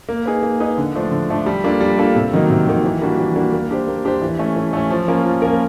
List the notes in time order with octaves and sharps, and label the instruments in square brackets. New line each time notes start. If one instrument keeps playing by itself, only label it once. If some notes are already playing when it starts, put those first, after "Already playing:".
[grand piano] A#3
D#4 G#4 B4
A#3
D#4 G#4 B4
D3
F3 A3 D4
D3
F3 A3 D4
G3
A#3 D4 F4 A4
G3
A#3 D4 F4 A4
C3
D#3 F#3 A#3 D#4
C3
D#3 F#3 A#3 D#4
E3
G3 A#3 D4 F#4
E3
G3 A#3 D4 F#4
A#3
D4 G4 C5
A#3
D4 G4 C5
E3
A3 C#4
E3
A3 C#4
F3
A#3 C#4 F4 A#4
F3
A#3 C#4 F4 A#4